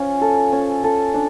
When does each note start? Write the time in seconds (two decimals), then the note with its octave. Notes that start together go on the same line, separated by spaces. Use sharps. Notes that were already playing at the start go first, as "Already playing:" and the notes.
Already playing: C#4 F4
0.21 A4
0.52 C#4
0.84 A4
1.14 D4